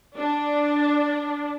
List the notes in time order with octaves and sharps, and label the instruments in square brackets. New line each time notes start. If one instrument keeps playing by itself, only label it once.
[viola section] D4